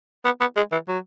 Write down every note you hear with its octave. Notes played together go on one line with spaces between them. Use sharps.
B3
B3
G#3
E3
F#3